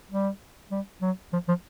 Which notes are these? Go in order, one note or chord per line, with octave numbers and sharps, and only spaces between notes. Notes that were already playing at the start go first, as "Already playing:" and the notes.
G3
G3
F#3
F3
F3